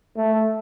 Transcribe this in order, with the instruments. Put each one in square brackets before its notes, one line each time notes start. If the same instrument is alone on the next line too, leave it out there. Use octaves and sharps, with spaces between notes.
[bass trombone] A3